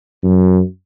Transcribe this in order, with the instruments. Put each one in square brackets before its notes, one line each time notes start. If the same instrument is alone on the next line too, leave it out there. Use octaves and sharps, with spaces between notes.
[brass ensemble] F#2